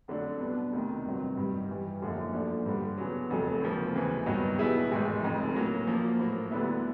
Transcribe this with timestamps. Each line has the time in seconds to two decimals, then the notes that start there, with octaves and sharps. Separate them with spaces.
0.08 F2 D3 F#3 A3 D4
0.40 B2 G3 B3 D4
0.73 D2 C3 D#3
1.05 G1 F2 C3 D#3 F#3
1.37 G2 D#3 G3
1.69 G2 E3 G3
2.02 G#1 F#2 D3 F3 A#3
2.33 A#2 F3 A3 D4 F#4
2.66 G2 D3 G3
2.97 E2 C#3 F#3
3.30 F1 F2 C#3 F#3 A3
3.62 C#2 C3 F3 A#3
3.94 D#2 C#3 E3
4.26 G2 D#3 F#3 B3 D#4
4.59 B2 G3 B3 E4 G#4
4.91 A1 G#2 D#3 G#3
5.23 F1 F2 C#3
5.55 A2 F#3 A#3 C#4
5.87 A#2 F3 A#3
6.19 A2 F#3 A#3
6.51 D2 D3 G3 B3 E4